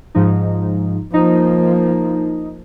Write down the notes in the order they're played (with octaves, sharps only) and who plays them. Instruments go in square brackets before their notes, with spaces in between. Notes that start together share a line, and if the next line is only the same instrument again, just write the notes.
[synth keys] G#2 F3 D#4
[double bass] F3 A#3 [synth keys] D#4